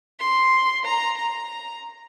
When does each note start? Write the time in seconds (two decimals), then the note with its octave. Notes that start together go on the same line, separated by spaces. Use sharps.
0.20 C6
0.85 A#5
1.17 A#5